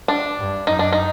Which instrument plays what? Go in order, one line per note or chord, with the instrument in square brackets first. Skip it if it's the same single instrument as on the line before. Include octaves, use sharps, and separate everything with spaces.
[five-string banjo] D4
[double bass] G2
[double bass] F#2 [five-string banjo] D#4
[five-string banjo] D4
D#4